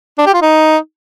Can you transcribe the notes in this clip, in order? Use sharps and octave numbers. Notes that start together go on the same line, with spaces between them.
D4
G4
F4
D#4